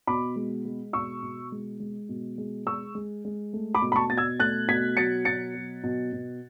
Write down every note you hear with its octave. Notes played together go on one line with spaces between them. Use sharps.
B2 B5 D6
G#3
G#3
B2 C#6 E6
B2
G#3
G#3
B2
G#3
G#3 C#6 E6
G#3
G#3
A3
B5 D6
B2
B5
A5 C#6
B2 A6
E6 G#6
A3 F#6 A6
B2 G#6 B6
F#3 A6 C#7
B2 A6 C#7
F#3
B2
B2